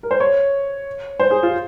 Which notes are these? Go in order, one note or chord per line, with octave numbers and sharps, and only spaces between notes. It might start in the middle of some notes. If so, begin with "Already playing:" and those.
A#4
C5
C#5
C5
G#4
F4